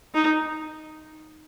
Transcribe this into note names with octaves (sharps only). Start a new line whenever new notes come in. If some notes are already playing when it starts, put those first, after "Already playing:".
D#4